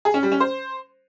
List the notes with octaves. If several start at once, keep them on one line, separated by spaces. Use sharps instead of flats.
G#4
C#4
G3
C#4
C5